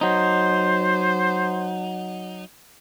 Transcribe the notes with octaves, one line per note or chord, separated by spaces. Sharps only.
F#3 D#4 C5